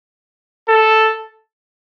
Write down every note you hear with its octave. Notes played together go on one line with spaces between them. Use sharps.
A4